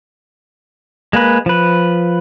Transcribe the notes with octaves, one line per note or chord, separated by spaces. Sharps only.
G#3 A#3 B4
F3 B4